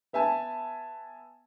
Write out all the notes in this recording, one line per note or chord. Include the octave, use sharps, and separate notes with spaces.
B3 E5 G#5 A5